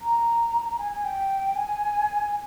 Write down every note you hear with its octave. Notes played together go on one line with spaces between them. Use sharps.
A#5
G#5
G#5
G5
G#5